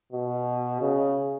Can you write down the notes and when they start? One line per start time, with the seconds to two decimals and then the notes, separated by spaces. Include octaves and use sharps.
0.12 B2
0.81 C#3